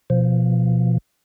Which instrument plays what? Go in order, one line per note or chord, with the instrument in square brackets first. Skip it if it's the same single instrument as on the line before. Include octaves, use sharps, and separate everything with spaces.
[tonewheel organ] B2 F3